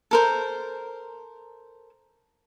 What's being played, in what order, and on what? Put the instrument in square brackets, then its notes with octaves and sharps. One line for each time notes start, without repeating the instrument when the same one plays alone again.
[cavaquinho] A4 A#4 C5